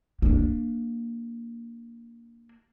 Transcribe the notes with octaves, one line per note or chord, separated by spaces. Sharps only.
A#3 D4